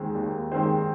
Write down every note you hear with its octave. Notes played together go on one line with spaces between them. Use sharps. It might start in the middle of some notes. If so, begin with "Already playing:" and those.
Already playing: D#2 D#3 G#3 C4
D#2
D#3 G#3 C4 C5